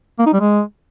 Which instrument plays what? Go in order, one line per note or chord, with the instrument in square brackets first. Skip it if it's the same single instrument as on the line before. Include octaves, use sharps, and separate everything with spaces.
[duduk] A#3
D#4
G3
G#3